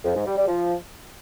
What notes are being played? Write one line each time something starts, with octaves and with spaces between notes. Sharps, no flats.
F2
G#2
G3
G3
F3